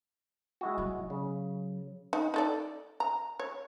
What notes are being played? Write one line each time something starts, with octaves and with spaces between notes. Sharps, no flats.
G#3 E4 F#4
F#3
C#3
D#4
D#4 A4 D5
A#5
C#5